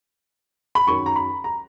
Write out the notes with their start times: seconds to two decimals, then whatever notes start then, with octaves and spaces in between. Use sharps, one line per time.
0.75 B5
0.87 F#2 D#3 F#3 C#6
1.06 A#5
1.16 B5
1.44 A#5